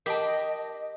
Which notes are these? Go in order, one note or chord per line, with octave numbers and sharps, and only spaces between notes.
G4 A#4 D#5 A5 B5